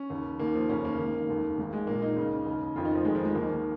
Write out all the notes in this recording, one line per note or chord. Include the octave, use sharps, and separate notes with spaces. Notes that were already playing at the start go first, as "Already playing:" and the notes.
Already playing: C#4
D#2 C#3
D#2 D#3 A#3
F3
F1 D#2 C#3 C#4
A#3
G#1 G#2 D#3
F1 D#2 D#3
G#1 G#2 D#3
G#3
A#1 A#2 A#3
D#4
C#2 C#3
D#2 C#3
F1 F2 D#3 F4
D#4
F3
F1 F2 D#3 G#3
F3
G#3
D#2 D#3 A#3